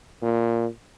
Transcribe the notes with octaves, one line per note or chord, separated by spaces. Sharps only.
A#2